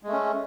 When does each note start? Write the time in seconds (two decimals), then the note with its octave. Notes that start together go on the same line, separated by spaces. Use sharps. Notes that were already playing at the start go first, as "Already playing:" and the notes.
0.03 G#3
0.08 A3
0.13 C#4